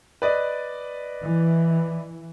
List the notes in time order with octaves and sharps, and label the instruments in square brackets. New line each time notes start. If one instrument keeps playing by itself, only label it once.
[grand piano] B4 D5 D#5
[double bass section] E3